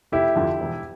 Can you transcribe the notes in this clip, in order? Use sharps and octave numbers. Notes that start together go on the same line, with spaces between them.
F1 E4 G4
F2 D3 F3
E1